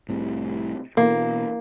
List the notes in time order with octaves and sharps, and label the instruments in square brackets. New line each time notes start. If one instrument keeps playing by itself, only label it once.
[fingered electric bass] C2 A2 C3
[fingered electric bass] B2 E3 [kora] A#3